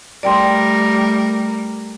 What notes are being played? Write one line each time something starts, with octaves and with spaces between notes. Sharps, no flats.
G3 A3 A#4 D5 G5 C6